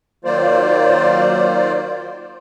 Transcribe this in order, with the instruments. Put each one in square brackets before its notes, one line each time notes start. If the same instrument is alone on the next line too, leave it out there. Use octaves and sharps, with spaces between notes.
[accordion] D#3 F#3 A#3 F4 C5 D5